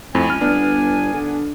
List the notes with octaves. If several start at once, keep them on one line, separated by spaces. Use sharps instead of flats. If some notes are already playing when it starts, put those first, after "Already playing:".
F2 A2 C4 G#5
C#2 F6
G1 B3 D4
D3